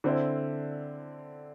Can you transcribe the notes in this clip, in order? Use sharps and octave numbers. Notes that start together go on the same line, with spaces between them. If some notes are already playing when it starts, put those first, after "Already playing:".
D3 C4 E4